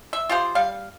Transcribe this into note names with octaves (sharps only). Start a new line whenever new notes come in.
E5
F4 G4 G#4 C5
G3 F5